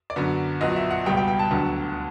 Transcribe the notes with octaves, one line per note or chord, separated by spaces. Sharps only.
D5
F#2 D3 F#3 B3
A#1 A#2 F#3 B3 D#5
E5
F#5
C#2 B2 G3 B3 G5
G5
G5
A5
D2 D3 F#3 B3